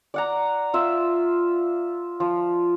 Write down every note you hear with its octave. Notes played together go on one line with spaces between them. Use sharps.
D5 F#5 A#5
F4 E5
F3